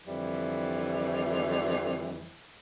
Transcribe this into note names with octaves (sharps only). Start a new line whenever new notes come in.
F2 D3 E3 G3